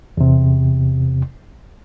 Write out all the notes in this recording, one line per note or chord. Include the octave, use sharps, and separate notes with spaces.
E2 C3